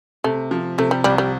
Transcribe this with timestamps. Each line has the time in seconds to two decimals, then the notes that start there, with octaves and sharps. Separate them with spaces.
0.24 C3 A3
0.51 F3
0.78 C3 A3
0.91 G3
1.04 C2 G3
1.18 G3